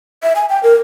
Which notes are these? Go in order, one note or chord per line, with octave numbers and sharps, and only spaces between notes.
E5
G#5
G5
A#4